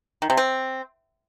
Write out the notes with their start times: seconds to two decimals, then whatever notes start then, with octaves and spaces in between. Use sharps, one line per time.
0.22 D#3
0.30 C3
0.37 C4